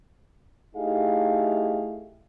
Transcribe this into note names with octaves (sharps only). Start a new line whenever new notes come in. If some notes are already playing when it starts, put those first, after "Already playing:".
A3 D#4 E4 G4 G#4 F5